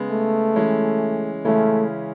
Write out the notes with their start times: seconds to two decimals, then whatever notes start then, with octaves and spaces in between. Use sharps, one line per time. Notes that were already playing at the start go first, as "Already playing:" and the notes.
Already playing: C#3 G#3 B3
0.11 A3
0.56 E3 G#3 C#4
1.45 C#3 E3 G#3 A3 C#4